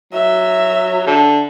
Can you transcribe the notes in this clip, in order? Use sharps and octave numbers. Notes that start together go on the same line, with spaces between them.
F#3 E5
D3